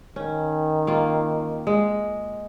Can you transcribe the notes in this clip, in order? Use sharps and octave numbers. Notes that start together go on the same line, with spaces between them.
D#3 C#4
A#3 F4
G#3